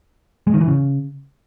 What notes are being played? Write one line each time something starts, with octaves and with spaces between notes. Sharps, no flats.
G#3
D#3
E3
C#3